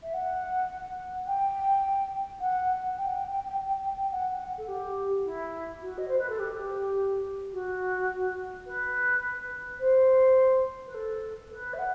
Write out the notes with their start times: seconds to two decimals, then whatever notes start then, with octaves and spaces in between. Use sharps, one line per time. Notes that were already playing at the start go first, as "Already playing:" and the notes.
0.03 E5
0.14 F#5
1.27 G5
2.40 F#5
2.98 G5
3.14 G5
3.31 G5
3.48 G5
3.64 G5
3.81 G5
3.98 G5
4.12 F#5
4.58 A4
4.68 G4
5.25 E4
5.82 F#4
5.98 D#5
6.08 C5
6.19 B4
6.29 A4
6.39 G4
7.53 F#4
8.66 B4
9.80 C5
10.87 B4
10.94 A4
11.51 B4
11.74 E5
11.79 F#5